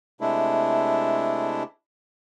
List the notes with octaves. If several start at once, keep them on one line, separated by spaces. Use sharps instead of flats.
C3 G#3 A3 D4 E4